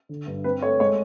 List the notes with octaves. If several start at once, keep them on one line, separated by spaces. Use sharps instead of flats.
D3
G2
C4 B4
A3 C#5
G#3 C#5